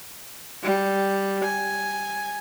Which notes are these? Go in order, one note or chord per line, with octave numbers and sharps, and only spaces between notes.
G3
G#5